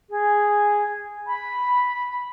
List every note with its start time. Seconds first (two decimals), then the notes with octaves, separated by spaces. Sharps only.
0.10 G#4
1.27 B5